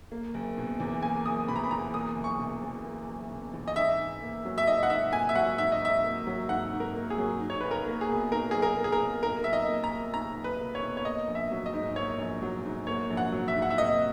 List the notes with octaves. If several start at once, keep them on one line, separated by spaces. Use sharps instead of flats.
A#3
F#1
B2
E2
A#3 G#5
F#1 D#6
B2 B5
A#5
B5
E2 A#5
A#3 D#6
F#1
C#6
B2
E2
A#3
F#1
B2
E2
D#5
G#2 E5
G#2
A#3
F#3
E5
G#2 D#5
F#5
G#2 E5
A#3 G#5
E5
F#3 F#5
G#2 E5
D#5
G#2 E5
A#3
F#3
G#2 F#5
G#2
A#4
A#3
G#4
F#3
D#4
C#5
B1 B4
A#4
A#3
G#4
B2
D#4 A#4
B1 G#4
A#4
A#3
G#4
A#4
B2
D#4 A#4
B1 E5
D#5
A#3
A#5
B2
D#4 A#5
B1
B4
A#3
C#5
B2
C#5
A#3 D#5
A#1
E5
F#3
D#5
G#2
A#3 C#5
A#1
F#3
G#2
A#3 C#5
A#1
F#5
F#3
E5
G#2
F#5
E5
A#3 D#5